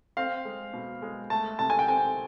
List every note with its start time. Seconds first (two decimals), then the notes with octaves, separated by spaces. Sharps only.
0.17 C4 F5
0.45 G#3
0.73 B2
1.02 G#3
1.30 A3 A5
1.59 C3 A5
1.70 G#5
1.79 G5
1.88 C4 G#5